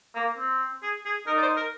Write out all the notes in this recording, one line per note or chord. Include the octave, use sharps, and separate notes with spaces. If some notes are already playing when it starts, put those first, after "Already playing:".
A#3
C4
G#4
G#4
D#4 A#4
D5
C5
A#4